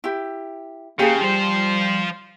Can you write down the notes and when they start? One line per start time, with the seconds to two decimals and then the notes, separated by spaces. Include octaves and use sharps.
0.04 E4 G4
0.99 C#3 A#3 G4 G#4
1.21 F3 G3 C5